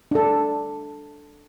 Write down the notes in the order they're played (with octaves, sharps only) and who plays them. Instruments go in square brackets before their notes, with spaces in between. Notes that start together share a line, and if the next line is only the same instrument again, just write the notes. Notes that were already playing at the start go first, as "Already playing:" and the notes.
[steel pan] D4 A4